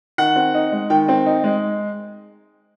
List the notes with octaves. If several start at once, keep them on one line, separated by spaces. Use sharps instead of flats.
D#3 F#5
C4
D#4
G#3
D#3 G5
C4
D#4
G#3